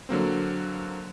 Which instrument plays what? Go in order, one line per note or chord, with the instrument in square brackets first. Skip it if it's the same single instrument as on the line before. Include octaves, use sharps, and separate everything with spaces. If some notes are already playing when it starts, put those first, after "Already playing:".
[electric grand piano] D3 F#3 A#3 C4